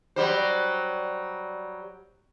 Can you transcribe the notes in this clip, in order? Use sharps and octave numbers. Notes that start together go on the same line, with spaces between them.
F#3 G3 C5